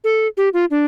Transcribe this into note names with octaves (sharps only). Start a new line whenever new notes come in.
A4
G4
F4
D4